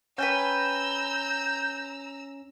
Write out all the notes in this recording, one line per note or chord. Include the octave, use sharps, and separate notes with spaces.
C#4 B4 G5 G#5 A#5 E6 G6